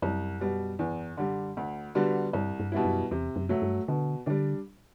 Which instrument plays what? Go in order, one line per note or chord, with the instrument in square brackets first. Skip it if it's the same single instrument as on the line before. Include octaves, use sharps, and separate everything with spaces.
[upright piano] C2 [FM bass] F#2
[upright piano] B2 G3
E2
D3 G3
D2
D3 G3 B3 F#4
[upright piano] C2 [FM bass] G2
[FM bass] G2
[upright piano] B2 G3 B3 E4
[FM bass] F#2
[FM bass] E2 [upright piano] C3
[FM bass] F#2
[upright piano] F#3 A3
[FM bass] G2
[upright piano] B2 [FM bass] D3
[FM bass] D3 [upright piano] G3 D4